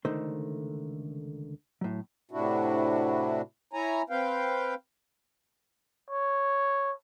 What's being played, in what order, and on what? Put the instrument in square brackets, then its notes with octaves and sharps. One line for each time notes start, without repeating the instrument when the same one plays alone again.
[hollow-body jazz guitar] C#2 D3 D#3 A3 C5 C6
A2 F#3
[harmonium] A2 C3 D4 E4 F#4
E4 C#5 G#5 A#5
C4 B4 F5 G5
[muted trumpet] C#5